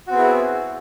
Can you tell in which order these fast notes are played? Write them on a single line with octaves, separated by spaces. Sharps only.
F#4 C4 B3 G#4 E4